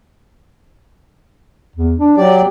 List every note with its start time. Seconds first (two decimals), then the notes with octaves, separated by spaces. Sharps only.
1.76 E2
1.98 D4
2.17 F#3 G4 D5